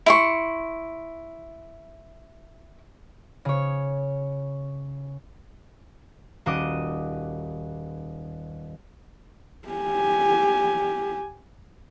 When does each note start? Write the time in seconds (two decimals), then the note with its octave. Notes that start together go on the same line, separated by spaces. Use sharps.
0.06 E4 C6 C#6
3.45 C#3 C#5
6.46 D#1 F#4 D#5 D6 D#6
9.69 G4 G#5